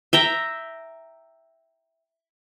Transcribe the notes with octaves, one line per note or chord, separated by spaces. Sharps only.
E5 G5 A#5